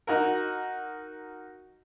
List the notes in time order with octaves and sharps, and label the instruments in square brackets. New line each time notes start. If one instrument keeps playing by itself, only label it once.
[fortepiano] D#4 F#4 A#4